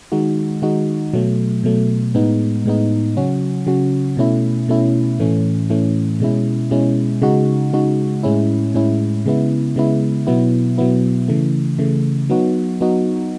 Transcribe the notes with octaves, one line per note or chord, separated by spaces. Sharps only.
D#3 G#3 D#4 F#4
D#3 G#3 D#4 F#4
B2 F#3 A3
B2 F#3 A3
A2 G#3 B3 D#4
A2 G#3 B3 D#4
C#3 F#3 C#4 F#4
C#3 F#3 C#4 F#4
B2 A3 C#4 E4
B2 A3 C#4 E4
A2 E3 A3 C#4
A2 E3 A3 C#4
B2 G#3 C#4 E4
B2 G#3 C#4 E4
C#3 G#3 D#4 F#4
C#3 G#3 D#4 F#4
A2 G#3 C#4 E4
A2 G#3 C#4 E4
C#3 G#3 B3 E4
C#3 G#3 B3 E4
B2 F#3 B3 E4
B2 F#3 B3 E4
C#3 E3 A3
C#3 E3 A3
F#3 B3 D#4 F#4
F#3 B3 D#4 F#4